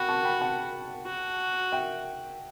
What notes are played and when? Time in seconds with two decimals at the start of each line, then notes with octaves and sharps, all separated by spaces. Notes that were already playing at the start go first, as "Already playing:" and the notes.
Already playing: F#4 G5 B5
0.09 A5 C#6
0.25 G5 B5
0.41 F#5 A5
1.06 F#4
1.72 E5 G5